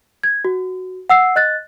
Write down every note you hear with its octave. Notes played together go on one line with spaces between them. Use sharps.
G#6
F#4
F#5 E6 C7
D#5 F#6 A6